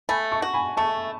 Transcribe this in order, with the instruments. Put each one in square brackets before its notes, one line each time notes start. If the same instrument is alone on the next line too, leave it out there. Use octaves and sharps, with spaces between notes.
[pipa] A3 [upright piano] G#5 B5
[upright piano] A5 C#6
[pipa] F#4
[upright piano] G#5 B5
[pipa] A3 [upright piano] A5 C#6